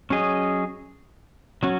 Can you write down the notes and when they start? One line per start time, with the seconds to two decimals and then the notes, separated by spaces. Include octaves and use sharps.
0.10 F#3 C#4 G#4 D#5
1.63 F#3 C#4 F#4